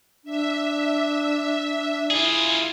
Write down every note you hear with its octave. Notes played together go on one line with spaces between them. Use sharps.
D4 E5
E4 F4 G#4